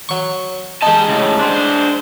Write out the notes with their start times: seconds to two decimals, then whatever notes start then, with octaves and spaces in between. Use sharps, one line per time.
0.09 F#3 C#6
0.82 G#3 D#4 G4 A5
1.08 A2 C#3
1.39 D4 C5